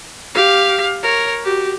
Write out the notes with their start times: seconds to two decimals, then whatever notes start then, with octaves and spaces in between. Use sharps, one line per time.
0.35 G4 F5
1.03 A#4 C#5
1.43 F#4 G4